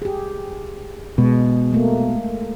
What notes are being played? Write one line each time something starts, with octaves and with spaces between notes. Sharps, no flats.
G4 G#4
B2 G#3
A3 A#3